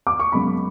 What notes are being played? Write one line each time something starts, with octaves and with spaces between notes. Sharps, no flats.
D6
C#6
F#2 C#3 G#3 B3 B5